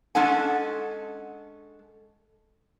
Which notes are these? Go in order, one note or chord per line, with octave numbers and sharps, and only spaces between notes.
G#3 C#4 D4 A4 F#5 G#5